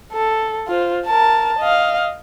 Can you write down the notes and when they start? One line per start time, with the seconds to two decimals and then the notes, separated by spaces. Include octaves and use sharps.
0.13 A4
0.68 F4 C5
1.06 A#4 A5
1.59 D#5 F5